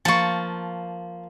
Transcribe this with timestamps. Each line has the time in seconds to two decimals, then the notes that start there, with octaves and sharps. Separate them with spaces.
0.05 F3 A#3 A5 C#6